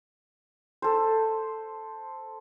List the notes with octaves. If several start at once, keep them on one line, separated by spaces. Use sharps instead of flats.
A4 C5